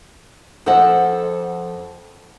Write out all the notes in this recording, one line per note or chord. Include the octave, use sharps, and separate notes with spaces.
F2 A4 C5 D#5 F#5